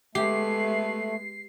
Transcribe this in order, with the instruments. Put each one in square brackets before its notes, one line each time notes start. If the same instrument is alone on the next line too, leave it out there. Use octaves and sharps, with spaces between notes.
[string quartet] G#3 B3 [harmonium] A3 [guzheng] G4 [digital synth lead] C7